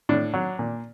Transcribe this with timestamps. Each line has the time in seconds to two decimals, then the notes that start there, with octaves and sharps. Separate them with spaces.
0.09 A2 D4
0.34 F#3
0.59 A#2